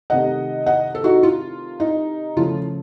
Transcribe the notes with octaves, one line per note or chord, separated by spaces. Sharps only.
C3 D#3 A3 D#5 F#5
D#5 F#5
A4
D#4 F#4
F4
D#4
C#3 F3 A3 F4